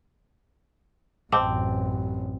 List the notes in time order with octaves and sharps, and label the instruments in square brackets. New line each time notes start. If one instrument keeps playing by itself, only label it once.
[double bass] A1 F#2 [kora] C4 [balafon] D#5 A5 D6